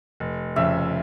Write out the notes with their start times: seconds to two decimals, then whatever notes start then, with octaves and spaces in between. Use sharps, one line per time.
0.20 F1
0.56 F2 C#3 E5